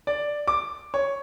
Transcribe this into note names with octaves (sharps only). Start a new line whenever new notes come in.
D5
D6
C#5